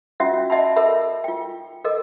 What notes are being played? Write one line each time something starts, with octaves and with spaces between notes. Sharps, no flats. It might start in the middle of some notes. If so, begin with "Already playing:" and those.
C#4 F4 F#4 E5 F#5
D#5 E5 F#5 A5 B5
A4 A#4 E5 B5
F4 G5
A4 A#4 D#5